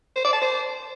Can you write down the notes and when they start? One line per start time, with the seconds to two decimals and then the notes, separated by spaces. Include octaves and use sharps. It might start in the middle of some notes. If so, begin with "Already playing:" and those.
0.16 C5
0.24 D5
0.33 A5
0.41 C5